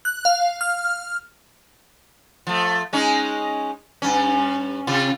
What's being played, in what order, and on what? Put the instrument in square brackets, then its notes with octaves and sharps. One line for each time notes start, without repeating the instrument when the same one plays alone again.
[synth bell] F#6
F5
F6
[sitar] F3 A3
G#3 C#4 D#4
G2 C#4
C3 F4